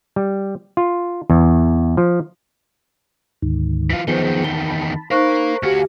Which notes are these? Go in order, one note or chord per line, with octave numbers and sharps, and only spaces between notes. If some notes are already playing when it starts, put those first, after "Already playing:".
G3
F4
E2
F3
D2 G#2 D#3
E3 F4
E2 D#3 F3 B3 G#4 C5 C7 G7
A5 B5 G7
D#4 A#4 C5 F5 B5 C#6 F#6
D2 F#4 G4 F5 G#5